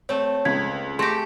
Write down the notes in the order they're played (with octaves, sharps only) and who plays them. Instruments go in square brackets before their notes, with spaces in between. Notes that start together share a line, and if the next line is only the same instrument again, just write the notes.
[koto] A3 C4 [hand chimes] C#5
[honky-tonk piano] C#2 [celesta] G#6 [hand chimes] B6
[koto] A3 G4 [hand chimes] G#4 [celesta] C6 A#6